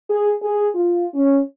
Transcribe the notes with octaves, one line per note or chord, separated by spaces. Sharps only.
G#4
G#4
F4
C#4